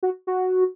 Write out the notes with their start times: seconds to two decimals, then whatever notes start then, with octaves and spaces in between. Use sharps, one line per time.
0.03 F#4
0.27 F#4